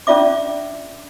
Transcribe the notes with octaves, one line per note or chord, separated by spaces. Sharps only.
C#4 D4 F4 D5 E5 D6